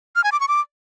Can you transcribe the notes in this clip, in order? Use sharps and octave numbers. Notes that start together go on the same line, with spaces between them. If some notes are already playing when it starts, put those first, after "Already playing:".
F6
G#5
D6
C#6
D6